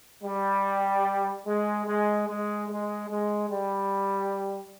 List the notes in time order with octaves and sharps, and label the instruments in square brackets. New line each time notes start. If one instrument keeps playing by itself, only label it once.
[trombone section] G3
G#3
G#3
G#3
G#3
G#3
G3